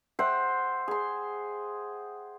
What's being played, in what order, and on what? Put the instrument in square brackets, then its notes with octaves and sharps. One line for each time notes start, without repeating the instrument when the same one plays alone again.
[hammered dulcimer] C5 E5 F#5 G5
G#4 C6